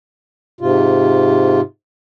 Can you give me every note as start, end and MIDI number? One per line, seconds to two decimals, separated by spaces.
0.61 1.61 44
0.61 1.61 48
0.61 1.61 65